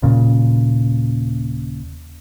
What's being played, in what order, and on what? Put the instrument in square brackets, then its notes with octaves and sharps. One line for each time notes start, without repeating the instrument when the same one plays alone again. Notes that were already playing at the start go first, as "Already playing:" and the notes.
[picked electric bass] D#1 A#2 C#3